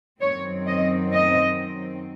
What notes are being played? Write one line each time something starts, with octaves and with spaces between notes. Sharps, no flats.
F#2 D#3 F#3 C4 C#5
D#5
D#5